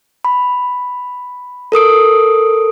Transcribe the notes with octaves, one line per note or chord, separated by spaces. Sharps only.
B5
A4 A#4 D#6 D7